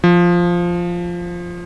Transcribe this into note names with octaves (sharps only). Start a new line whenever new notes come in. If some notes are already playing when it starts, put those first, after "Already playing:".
F3